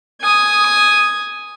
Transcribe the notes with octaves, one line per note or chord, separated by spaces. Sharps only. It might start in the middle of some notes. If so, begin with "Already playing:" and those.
G#5 D#6